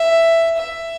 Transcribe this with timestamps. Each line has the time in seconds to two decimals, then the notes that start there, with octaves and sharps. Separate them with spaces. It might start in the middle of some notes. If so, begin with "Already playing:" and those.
Already playing: E5
0.58 E5